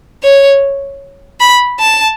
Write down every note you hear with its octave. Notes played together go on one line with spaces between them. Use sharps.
C#5
B5
A5